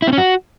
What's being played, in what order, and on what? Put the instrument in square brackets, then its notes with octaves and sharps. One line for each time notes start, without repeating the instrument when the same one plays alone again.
[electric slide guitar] E4
C4
C#4
F#4